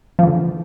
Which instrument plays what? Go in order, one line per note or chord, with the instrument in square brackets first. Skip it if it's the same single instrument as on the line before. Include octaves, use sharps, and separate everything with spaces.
[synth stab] F3
E3
D3